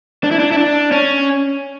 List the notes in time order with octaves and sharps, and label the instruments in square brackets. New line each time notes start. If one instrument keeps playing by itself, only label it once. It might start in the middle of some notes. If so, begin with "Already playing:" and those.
[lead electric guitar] D4
E4
D4
E4
D4
C#4